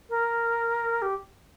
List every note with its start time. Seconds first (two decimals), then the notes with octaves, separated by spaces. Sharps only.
0.10 A#4
1.02 G4